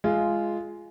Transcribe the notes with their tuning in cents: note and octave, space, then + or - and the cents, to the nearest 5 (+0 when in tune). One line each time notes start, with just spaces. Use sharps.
G#3 +10 F4 -15